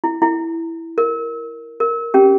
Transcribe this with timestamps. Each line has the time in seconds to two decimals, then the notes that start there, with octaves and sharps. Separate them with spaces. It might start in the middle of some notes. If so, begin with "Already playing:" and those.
0.04 E4
0.22 E4
0.98 A#4
1.80 A#4
2.14 C#4 G4